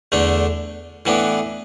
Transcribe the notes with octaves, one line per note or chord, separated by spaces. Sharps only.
E2 D3 A3 D4
A2 E3 B3 D4